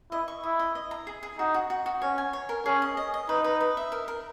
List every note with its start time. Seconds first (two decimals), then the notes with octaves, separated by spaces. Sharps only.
0.12 E4 D#5
0.28 C#6
0.44 E4 D#5
0.59 D#5
0.75 D#5
0.91 A#5
1.07 G#4
1.23 G#4
1.39 D#4 F#4
1.54 F#4
1.70 F#4
1.86 F#4
2.02 C#4 C#5
2.18 G#5
2.33 C#5
2.49 A#4
2.66 C#4 G#4
2.82 D#5
2.97 D#5
3.14 D#5
3.29 D#4 B4
3.44 B4
3.60 B4
3.77 E5
3.92 A#4
4.08 A#4